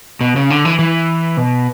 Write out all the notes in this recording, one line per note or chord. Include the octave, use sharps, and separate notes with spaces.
B2
C#3
D3
E3
E3
B2